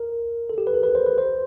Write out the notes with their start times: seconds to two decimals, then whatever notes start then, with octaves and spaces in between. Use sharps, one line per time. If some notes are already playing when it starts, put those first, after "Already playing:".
Already playing: A#4
0.50 A4
0.58 G4
0.67 B4
0.74 A#4
0.83 B4
0.95 C5
1.06 B4
1.18 C5